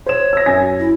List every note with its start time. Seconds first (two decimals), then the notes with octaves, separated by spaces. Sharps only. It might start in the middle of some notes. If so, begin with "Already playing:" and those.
0.06 C5 C#5 E7
0.33 E6 A#6
0.46 F#2 G#5 A#6
0.80 E4